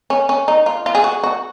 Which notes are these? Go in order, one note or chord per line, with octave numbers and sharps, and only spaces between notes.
C#4
C#4
D#4
F4
F4
G#4
F#4
F#4